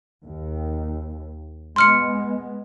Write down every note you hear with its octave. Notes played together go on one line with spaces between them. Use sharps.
D#2
G#3 B3 C6 F6 C#7